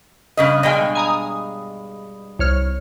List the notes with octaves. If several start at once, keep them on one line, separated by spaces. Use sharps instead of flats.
G2 C#3 D#5
G2 B2 G#3 D#5 G5 G#5
G#5 A#5 D#6
C2 C#5 F6